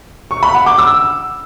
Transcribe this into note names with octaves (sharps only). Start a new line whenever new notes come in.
C#6
B5
F#5
D6
E6